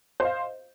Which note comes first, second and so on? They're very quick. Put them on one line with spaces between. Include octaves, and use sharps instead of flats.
C5 D#5 F5